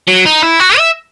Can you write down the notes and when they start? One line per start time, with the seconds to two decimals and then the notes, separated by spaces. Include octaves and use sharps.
0.08 F#3
0.26 D#4
0.43 E4
0.60 F#4
0.78 E5